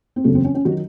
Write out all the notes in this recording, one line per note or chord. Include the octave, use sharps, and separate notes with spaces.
C4
F#1 E2 C#3 F#3 A3
C4
C#4
C#4
D#3 F#3 F#4